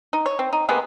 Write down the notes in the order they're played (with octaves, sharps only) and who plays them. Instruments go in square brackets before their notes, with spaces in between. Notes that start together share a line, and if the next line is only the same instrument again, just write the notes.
[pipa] D#4
C#5
C4
D#4
C3 G#3 A#3 B3